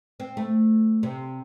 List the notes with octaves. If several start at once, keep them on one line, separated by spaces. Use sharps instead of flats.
C4
A3
C3